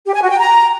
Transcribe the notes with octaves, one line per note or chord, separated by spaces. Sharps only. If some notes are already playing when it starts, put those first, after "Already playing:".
G4
G#5
F#4
G5
A#5